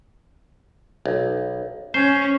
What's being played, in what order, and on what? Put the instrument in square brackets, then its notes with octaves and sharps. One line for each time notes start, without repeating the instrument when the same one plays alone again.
[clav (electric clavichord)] B1
[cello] C#4 [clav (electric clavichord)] C5